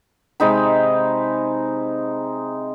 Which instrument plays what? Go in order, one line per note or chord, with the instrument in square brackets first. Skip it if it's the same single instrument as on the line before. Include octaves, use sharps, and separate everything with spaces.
[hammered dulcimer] C3 G#3 D#4 B5